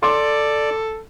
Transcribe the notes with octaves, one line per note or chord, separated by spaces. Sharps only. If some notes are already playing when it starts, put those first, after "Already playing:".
A4 D5 C6 D6